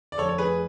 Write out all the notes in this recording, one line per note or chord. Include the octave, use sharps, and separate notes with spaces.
D5
F1 A4 C#5
C#5
F1 G#4 B4